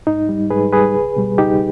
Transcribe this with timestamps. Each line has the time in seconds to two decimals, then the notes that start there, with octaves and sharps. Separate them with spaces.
0.07 G#2 D#4
0.29 G3
0.50 G#2 G#4 B4
0.72 G3 G#4 B4
0.95 C#2
1.16 B2 G3
1.38 C#2 D#4 G4